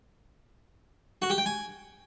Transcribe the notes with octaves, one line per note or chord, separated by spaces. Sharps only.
F#4
G4
G5
G#5